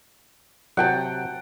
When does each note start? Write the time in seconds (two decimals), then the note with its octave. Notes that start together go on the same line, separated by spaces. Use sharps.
0.77 C3 F#3 F#5 G5 A5